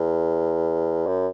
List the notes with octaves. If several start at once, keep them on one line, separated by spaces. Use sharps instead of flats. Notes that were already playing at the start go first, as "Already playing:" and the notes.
Already playing: E2
F#2